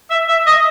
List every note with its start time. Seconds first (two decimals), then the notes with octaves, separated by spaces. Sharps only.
0.10 E5
0.28 E5
0.46 D#5